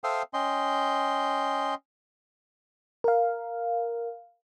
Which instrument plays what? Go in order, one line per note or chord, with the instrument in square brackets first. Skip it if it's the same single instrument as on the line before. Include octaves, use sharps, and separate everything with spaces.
[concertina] A4 C5 E5 F5 G5 D#6
C#4 D#5 G5 C6
[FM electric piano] A#4 F5